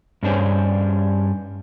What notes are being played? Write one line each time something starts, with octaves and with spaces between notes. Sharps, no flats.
G2 C#4 D4 G#4 C5